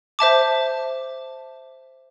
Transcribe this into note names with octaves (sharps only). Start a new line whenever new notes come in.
C5 E5 A5 D6